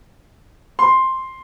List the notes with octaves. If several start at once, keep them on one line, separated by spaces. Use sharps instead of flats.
C6